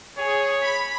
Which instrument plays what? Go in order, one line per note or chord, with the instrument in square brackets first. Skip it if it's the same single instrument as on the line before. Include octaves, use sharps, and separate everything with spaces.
[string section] G#4 [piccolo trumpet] C#5
[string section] B5